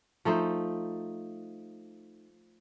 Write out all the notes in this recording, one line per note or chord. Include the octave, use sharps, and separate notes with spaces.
F3 A3 D#4 C5